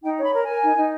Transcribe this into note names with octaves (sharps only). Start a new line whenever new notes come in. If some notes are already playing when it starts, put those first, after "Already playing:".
D#4 G5
C#5 B5
A#4
A#4 G#5
D#4
D#4